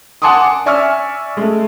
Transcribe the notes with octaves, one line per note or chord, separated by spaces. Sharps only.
F#5 G#5 A5 C6 D6 D#6
D6
D5 E5 G#5 C#6 E6 F6
G#3 A3